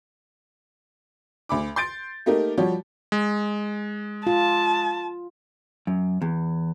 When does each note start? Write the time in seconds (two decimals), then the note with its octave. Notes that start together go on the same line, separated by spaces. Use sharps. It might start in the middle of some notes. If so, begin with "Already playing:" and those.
1.49 D2 B5 D6
1.76 C6 G6 A6 D7
2.26 A3 A#3 D#4 G4 A#4
2.58 F3 G3 F#4 G4 C#5
3.12 G#3
4.27 F4 A5
5.87 F#2
6.22 E2